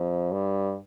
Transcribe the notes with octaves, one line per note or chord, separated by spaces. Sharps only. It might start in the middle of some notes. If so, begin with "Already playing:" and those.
Already playing: F2
G2